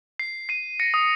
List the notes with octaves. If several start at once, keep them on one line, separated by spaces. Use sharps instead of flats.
C7
C7 D#7
A#6 C#7
D#6